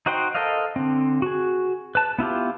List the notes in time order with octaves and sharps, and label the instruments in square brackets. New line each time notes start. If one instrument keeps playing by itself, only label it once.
[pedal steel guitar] D#4 F#4 C5 G5 C6
A4 A#4 C5 D#5 F5
D3 C4
F#4 G#4
B4 A5
B3 E4 F4 G4